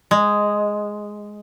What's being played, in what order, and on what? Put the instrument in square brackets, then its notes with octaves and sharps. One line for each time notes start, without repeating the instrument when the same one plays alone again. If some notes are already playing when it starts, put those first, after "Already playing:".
[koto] G#3